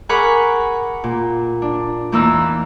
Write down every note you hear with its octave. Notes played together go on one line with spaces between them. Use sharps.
G#4 A#4 F#5 B5 C#6 D6
A#2
D4
E2 E3 A#3 D#4 E6